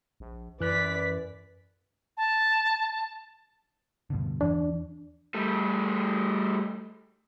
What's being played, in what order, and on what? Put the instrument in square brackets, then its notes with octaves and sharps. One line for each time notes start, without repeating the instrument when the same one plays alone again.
[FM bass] A#1
[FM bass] F#2 [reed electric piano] E3 F#6 [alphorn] B4 [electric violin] D5 B6
[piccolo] A5
[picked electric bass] G2 B2 D3
[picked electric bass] E2 E3 [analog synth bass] D4
[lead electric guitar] G3 A3